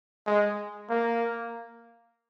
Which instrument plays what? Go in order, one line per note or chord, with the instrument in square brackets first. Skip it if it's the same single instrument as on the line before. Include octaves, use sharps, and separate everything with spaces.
[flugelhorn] G#3
A#3